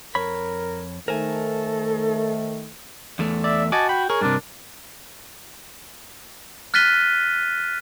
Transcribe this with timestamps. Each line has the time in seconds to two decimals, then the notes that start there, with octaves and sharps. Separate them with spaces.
0.15 F2 A#4 C#5 B5
1.08 D#3 A3 A4 A#4 C5 G#5
3.19 E2 A3
3.44 D5 E5
3.72 F#4 D#5 G#5 A5 D6
3.89 G5 B5
4.10 G#4 A#4 C#5
4.21 G2 C3 D4
6.74 F6 F#6 A6 B6 D#7 G7